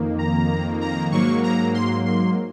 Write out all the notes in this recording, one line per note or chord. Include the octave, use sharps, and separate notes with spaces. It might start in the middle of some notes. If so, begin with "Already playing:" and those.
Already playing: F2 D#3 A#3
A#5
A#5
G#2 F#3 A#3 C#6
A#5
C6
C6